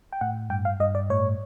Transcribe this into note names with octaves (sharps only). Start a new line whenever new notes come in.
G5
A2 F#5
G2 G5
F5
G2 D#5
D5
A2 C#5